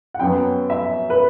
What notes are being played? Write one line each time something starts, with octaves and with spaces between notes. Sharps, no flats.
F#5
F#2 F#3 B3 G5
E5
B4